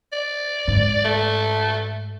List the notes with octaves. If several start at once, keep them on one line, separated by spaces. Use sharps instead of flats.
D5
G#2
A3